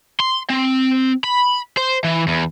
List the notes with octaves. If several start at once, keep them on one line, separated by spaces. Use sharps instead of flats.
C6
C4
B5
C5
E3
E2